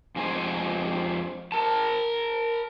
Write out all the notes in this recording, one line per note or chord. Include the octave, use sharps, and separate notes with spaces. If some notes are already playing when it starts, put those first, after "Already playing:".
F2 G#3 G#4 C5 G#5
A#4 A5